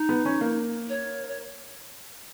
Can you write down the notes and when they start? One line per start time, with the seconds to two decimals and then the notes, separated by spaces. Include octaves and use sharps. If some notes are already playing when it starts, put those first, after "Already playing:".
Already playing: D#4
0.09 B3
0.26 C#4
0.41 A#3
0.89 C#5
1.28 C#5